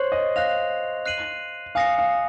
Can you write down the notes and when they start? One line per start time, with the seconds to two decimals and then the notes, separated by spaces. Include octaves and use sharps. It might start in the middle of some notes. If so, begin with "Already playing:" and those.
Already playing: C5 C#5 C6 F#6 C7 F#7
0.12 D#5
0.36 F5 F#6 A#6 F7
1.06 F#6 C7 D#7 F#7
1.75 F5 G#5 D#6 A#6 C#7
1.98 F5